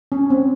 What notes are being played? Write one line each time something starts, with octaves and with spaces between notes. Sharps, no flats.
C#4
C4